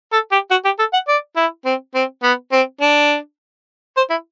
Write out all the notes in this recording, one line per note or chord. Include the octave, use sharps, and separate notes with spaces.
A4
G4
F#4
G4
A4
F#5
D5
E4
C4
C4
B3
C4
D4
C5
E4